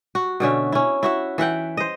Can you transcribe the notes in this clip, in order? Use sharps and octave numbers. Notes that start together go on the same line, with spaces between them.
F#4
B2 D3 C#4 E5
C#4 E4
E4 F#4 E5
E3 E5 F#5 G5
C5 D#5